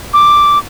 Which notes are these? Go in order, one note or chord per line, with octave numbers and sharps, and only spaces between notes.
D6